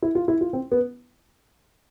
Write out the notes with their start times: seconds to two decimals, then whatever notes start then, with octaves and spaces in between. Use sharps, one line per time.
0.02 E4
0.15 F4
0.28 E4
0.41 F4
0.53 C4
0.72 B3